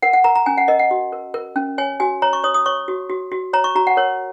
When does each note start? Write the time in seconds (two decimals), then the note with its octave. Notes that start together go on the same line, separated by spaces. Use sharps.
0.02 A#4 F#5
0.13 F#5
0.24 A#4 A#5
0.35 A#5
0.46 C#4 G#5
0.57 F#5
0.68 A#4 D#5
0.79 F#5
0.91 F#4
1.12 A#4
1.34 A#4
1.56 C#4
1.78 C#5 G#5
2.00 F#4 G#5
2.22 C#5 A#5
2.33 C#6
2.44 C#5 D#6
2.54 D#6
2.66 C#5 C#6
2.88 F#4
3.10 F#4
3.32 F#4
3.53 C#5 A#5
3.64 C#6
3.76 F#4 A#5
3.87 F#5
3.97 A#4 C#5